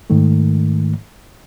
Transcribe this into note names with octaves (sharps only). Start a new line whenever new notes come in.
G#2 D#3 A3